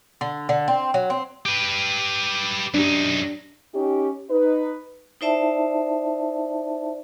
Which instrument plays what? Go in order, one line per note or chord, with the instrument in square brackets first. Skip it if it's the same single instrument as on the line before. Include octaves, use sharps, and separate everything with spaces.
[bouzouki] D3
D3
C4
F#3
C4
[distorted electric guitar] G4 B4
[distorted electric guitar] F#2 D#4 [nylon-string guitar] D4 G4
[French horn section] C#4 D#4 G4
D#4 B4
[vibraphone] D#4 E4 C5 D5 E5 A5